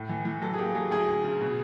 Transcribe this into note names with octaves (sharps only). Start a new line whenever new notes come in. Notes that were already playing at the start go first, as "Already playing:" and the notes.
Already playing: A2 A4
E3
E3
F#3 A4
G#4
A#3 G4
F#3 G#4
D2 G#4
D2
C#3
B2